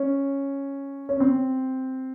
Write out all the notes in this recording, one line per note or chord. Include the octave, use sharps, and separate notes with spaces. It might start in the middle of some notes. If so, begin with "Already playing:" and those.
Already playing: C#4
C#4
C4